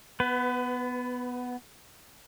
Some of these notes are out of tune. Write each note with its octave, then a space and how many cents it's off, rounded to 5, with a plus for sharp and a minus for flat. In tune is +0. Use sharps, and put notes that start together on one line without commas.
B3 +0 B4 +30